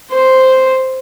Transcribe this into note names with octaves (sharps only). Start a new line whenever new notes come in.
C5